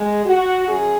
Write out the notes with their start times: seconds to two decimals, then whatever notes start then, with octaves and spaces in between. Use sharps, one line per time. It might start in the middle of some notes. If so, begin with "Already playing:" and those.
Already playing: G#3
0.26 F#4
0.68 F#2 G#4